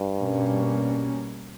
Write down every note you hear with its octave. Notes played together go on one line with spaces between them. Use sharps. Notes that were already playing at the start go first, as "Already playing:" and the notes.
Already playing: G2
B2 G3 A#3 C#4